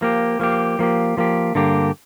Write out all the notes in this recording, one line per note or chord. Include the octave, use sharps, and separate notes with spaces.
F3 A#3 G4
F3 A#3 G4
F3 A#3 G4
F3 A#3 G4
G2 D3 A#3 G4